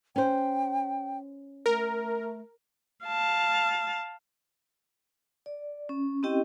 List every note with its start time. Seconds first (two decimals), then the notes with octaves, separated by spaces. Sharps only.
0.16 C#4 C5 G5
1.66 A3 A#4
3.06 F5 A5
5.46 D5
5.89 C#4
6.23 C4 C#4 E4 G4 D#5 G5